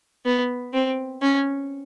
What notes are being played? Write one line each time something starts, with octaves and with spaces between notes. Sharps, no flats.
B3
C4
C#4